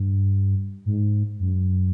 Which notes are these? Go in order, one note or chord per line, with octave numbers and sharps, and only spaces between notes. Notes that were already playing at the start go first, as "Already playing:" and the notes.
Already playing: G2
G#2
F#2